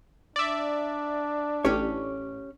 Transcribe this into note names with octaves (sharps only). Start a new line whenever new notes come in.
D4 D5 E5
A1 C#4 G4 C#5